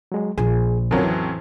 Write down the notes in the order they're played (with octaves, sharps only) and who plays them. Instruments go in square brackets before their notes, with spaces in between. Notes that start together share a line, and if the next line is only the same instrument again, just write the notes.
[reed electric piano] F#3 G#3
[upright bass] A#1 F4 [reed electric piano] G#4
[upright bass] A1 [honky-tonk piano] F2 F#3 C#4 [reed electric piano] D3 F4 A#4
[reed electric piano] E3